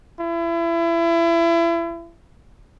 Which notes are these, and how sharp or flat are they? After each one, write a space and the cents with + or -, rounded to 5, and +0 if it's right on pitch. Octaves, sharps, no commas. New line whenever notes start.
E4 +30